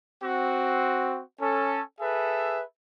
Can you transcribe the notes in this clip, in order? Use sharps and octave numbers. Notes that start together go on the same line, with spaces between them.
C4 F#4
C#4 A4
G#4 A4 B4 E5